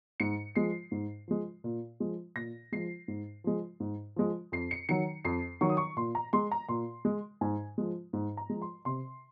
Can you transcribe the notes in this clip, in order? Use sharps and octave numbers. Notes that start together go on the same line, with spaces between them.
G#2 C#7
F3 G#3 C7
G#2
F3 G#3
A#2
F3 G#3
A#2 A#6
F3 G#3 C7
G#2
F3 G#3
G#2
F3 G#3
F2 C7
C#7
D#3 F#3 C#7
F2 C7
D#3 F#3 C#6
D#6
C#6
A#2 C6
A#5
G#3 C6
A#5
A#2 C6
G#3
G#2 G#5
F3 G#3
G#2
A#5
F3 G#3
C6
C3 C6